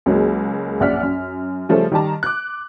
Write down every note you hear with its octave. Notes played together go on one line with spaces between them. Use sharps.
C#2 F#3 G#3 A#3
A#1 F#2 D5 F#5 F6 B6
F#2
C#3 F3 G3 A3 C#4 A4
D#3 G3 G4 A5 A#5
D6 F#6